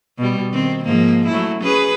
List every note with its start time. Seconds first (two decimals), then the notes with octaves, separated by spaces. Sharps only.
0.18 B2 G3
0.52 D#3 C4
0.84 G#2 F3 A#3
1.27 F#3 A3 E4
1.61 C#4 G#4 B4